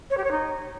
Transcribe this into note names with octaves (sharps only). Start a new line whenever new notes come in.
C#5
G4
C#5
D#4